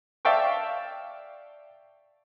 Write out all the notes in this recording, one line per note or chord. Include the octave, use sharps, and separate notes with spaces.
D5 E5 F5 G5 A5 C#6